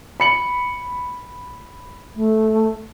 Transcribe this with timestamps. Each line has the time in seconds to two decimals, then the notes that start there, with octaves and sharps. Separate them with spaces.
0.20 B5 C#7 F#7
2.16 A3